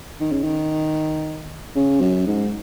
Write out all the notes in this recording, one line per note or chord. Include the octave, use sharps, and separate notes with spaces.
D#3
C#3
D#3
C#3
F#2
G#2